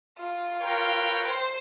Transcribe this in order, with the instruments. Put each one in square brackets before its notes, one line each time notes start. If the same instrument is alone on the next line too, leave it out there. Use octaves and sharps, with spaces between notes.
[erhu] F4
[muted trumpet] A#4 [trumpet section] B4 C#5 G5
[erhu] C5